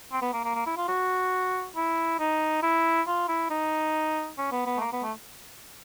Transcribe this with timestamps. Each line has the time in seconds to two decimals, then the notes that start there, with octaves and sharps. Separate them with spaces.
0.12 C4
0.22 B3
0.33 A#3
0.45 A#3
0.55 A#3
0.66 E4
0.77 F4
0.88 F#4
1.76 E4
2.19 D#4
2.62 E4
3.07 F4
3.28 E4
3.51 D#4
4.38 C#4
4.52 B3
4.66 B3
4.77 A3
4.81 A#3
4.93 B3
5.03 A3